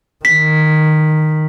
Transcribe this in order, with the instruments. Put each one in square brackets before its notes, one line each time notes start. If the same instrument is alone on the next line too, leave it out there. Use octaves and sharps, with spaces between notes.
[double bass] D#3 [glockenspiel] B6